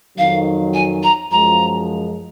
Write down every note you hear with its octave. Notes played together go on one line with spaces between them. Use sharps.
F2 D#3 F#3 F5
G#5
A#5
F#2 F3 G#3 A#5